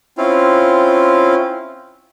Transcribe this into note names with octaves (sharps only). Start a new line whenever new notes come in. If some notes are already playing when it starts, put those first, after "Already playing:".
C4 C#4 E4 F4 F5